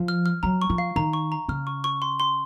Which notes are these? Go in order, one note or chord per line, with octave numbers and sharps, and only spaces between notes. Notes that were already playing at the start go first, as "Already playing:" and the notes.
Already playing: F3
F6
F6
F#3 A#5
C#6
F3
F5
D#3 A#5
C#6
A#5
C#3 F6
C#6
C#6
C6
C6